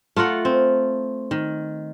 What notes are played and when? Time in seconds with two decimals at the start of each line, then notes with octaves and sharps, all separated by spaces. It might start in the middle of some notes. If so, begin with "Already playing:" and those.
0.16 A3 F4 A#4 F#5
0.45 C4
1.31 D#3